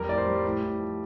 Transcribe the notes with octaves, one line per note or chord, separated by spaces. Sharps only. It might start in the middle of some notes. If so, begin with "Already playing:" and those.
Already playing: F2 G3 A#4
A2 D5
C5
G3
A2
A2
F3